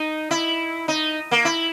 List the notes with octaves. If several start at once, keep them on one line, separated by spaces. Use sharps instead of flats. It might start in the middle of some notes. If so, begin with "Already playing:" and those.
Already playing: D#4
E4
D#4
A#3
E4